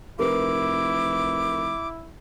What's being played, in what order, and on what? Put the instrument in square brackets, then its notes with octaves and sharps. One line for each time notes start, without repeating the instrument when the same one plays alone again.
[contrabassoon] F1 [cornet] E4 [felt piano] A#4 B4 [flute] D6